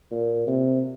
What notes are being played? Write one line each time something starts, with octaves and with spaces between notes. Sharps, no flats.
A#2
C3